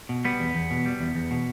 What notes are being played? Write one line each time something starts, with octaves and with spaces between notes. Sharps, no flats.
B2
G3 B3
E2
E2
B2
G3
E2
E2
B2